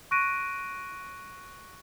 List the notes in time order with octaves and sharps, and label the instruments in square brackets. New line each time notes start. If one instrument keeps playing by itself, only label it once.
[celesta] C#6 F#6 A#6 D7 D#7